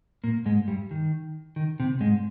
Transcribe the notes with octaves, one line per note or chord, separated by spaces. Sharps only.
A#2 A#3
G#2 G#3
G2 G3
D#3
D#3
C3
G#2 G#3